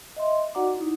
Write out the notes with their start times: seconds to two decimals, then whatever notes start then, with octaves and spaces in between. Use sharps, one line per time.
0.17 D#5 E5 C6
0.55 D#4 F#4 D5 F#5 A#5 D6
0.77 D#4 E4